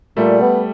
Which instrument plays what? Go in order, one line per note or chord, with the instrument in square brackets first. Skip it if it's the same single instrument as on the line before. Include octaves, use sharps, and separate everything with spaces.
[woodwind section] A#2 [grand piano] G3 A3
[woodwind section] B3